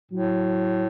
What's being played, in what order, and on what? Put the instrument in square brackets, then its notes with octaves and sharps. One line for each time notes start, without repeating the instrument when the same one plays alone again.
[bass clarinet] A2 [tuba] F#3